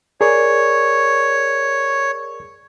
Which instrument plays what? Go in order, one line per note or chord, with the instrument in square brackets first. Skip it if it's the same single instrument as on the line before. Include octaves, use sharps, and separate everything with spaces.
[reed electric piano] G#4 A#4 D5 [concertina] C#5